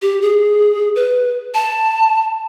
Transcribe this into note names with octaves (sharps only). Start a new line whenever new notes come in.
G4
G#4
B4
A5